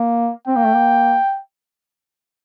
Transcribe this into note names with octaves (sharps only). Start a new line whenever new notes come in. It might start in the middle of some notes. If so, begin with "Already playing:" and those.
Already playing: A#3
C4 G5
A#3
A3
A#3